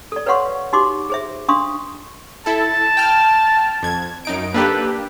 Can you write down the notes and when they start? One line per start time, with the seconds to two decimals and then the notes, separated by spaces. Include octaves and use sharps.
0.12 A4 D5
0.26 B4 C#5 F5 F#5 C6 C#6
0.73 D#4 F#4 G4 C6 D6
1.10 G#4 C5 E5
1.49 D4 F5 C6 C#6 D#6
2.46 E4 A4 A5
2.97 G5 F6
3.83 F2 G#6
4.25 F#2 D#4 D7
4.54 A#3 D4 G4 A4 B4